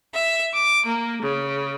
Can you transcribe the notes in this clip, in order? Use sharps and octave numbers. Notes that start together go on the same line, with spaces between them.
E5
D6
A#3
C#3